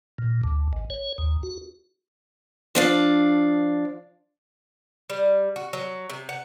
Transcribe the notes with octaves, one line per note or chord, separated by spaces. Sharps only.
A#2
D2
G#1
C#5
D#2
F#4
F3 D4 F5
G3
F#4
F#3
C3
F#5